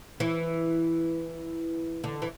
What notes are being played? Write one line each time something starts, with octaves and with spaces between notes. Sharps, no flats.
E3
D3
E3